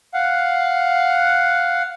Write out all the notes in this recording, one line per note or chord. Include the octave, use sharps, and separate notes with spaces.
F5 F#5